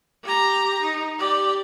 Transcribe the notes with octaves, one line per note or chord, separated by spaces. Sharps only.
G4 A#5
D#4
G4 D5